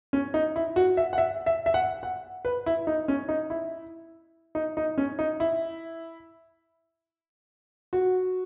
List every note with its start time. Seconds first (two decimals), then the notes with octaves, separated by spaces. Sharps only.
0.13 C#4
0.34 D#4
0.56 E4
0.76 F#4
0.97 E5
1.13 F#5
1.18 E5
1.46 E5
1.66 E5
1.74 F#5
2.03 F#5
2.45 B4
2.66 E4
2.87 D#4
3.08 C#4
3.29 D#4
3.50 E4
4.55 D#4
4.77 D#4
4.98 C#4
5.19 D#4
5.40 E4
7.93 F#4